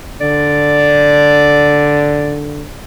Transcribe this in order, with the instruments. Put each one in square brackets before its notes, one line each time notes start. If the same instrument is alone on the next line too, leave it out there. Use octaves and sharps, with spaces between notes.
[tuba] D3 [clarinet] D5